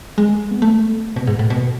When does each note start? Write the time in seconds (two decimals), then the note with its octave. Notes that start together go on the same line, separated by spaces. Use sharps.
0.18 G#3
0.51 B3
0.62 A3
1.16 B2
1.27 G#2
1.39 A2
1.50 B2